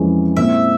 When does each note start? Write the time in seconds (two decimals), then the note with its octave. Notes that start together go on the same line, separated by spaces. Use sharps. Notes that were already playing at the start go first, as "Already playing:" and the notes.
Already playing: F2 E3 G#3 C#4
0.37 A#2 G#3 C4 E4 E5